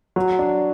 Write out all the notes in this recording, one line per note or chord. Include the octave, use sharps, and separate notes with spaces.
F#3
D4